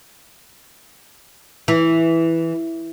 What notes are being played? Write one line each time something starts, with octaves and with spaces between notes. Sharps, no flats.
E3